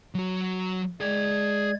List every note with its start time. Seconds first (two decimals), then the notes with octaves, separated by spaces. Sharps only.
0.15 F#3 F#4
1.00 G#3 G#4 D5 G5 G#6